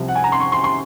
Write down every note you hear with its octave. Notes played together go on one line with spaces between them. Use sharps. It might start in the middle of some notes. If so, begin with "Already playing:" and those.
Already playing: C2 C3 F3
F#5
G#5
A#5
C6
C#6
C6
C6